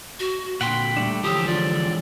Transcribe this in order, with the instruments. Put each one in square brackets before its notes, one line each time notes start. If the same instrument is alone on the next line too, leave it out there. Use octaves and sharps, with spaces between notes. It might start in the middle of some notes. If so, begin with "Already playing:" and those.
[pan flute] F#4
[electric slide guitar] A#2 D3 [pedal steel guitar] F#5 C6 [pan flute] G5 [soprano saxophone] B5
[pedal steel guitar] G3 A3 D4
[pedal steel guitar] D3 F3 E6 [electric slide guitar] E3 G#3 C#5 [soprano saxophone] G4 [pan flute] D#6
[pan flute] F4 [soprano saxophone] D5